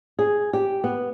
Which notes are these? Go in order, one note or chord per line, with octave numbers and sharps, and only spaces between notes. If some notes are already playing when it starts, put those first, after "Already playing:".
G#4
G4
B3